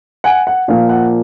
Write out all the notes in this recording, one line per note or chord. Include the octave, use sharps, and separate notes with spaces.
F#5 G#5
F#5
A#2 F3 A#3 F5
F#5